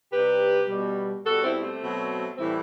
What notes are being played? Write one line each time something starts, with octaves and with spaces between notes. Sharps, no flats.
C3 G3 G4 B4
B2 G3
B2 G3 F#4 A4
C4 E4
A3 C4
B2 F#3
A2 E3 G3 C4 E4